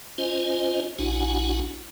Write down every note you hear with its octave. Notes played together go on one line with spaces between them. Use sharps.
C#4 F4 C5 D#5 G#5
A#1 D4 E4 F#4 F#5 G#5